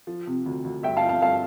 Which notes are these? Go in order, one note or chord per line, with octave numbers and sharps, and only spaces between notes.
F3
C3
D2
D2
G2 E5 G5
F5 A5
F3
F5 A5
G2 F5 A5